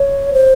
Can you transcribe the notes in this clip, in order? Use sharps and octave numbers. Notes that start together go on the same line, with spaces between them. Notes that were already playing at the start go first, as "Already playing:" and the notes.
Already playing: C#5
C5